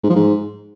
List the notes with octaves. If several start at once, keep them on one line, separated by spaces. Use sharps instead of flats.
G#2
F3
G#2